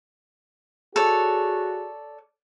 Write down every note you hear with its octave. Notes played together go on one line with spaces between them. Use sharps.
F#4 G#4 A4 C#5 D5